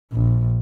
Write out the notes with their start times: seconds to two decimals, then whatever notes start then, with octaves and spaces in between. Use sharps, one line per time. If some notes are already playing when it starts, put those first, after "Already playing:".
0.13 A#1